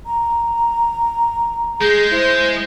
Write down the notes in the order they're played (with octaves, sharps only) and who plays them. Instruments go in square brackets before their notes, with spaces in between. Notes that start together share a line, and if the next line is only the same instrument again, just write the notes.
[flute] A#5
[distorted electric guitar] G#3 [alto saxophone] G#4 [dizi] G6
[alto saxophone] E4 [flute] C5